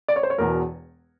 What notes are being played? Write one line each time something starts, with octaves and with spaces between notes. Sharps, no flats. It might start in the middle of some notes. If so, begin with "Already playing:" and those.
D5
C#5
C5
C#5
E1 E2 B2 A#4